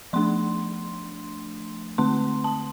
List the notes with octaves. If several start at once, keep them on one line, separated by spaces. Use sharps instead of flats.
F3 A3 D4 C6
D3 A3 C4 C6
A5